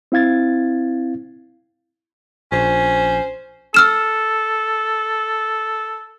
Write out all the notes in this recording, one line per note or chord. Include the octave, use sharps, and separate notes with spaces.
C4 E4 F5 G#6 A6
A#1 C#4 C5
A4 E6 F6 E7